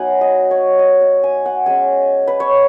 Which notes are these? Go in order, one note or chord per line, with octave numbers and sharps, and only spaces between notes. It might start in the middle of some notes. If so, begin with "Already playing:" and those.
Already playing: F#3 B3 D#4 F#5 G#5
D#5
C#5
D#5
D#5
G#5
F#5
G#3 C#4 G#5
B4
C#5